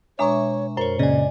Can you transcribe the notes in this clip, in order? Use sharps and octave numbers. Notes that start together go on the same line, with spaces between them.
B2 G#3 D4 C#5 E5 A#5 C#6
F#2 A#4 C5 C#5
A#2 C#3 D5 D#5 G#5